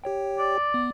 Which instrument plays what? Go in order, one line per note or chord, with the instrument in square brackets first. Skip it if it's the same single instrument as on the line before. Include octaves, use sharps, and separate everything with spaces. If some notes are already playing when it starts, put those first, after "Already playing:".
[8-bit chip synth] G4 C#5 G5
[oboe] D5
[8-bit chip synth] B3